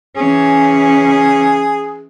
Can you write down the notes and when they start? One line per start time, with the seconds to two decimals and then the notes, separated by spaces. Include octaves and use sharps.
0.16 E3 C#4 G#4